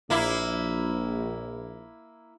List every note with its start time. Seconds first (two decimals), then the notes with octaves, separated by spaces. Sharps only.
0.10 A#1 A#3 E4